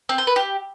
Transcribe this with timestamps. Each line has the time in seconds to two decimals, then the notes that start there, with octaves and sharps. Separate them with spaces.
0.09 C4
0.18 C5
0.27 B4
0.36 G4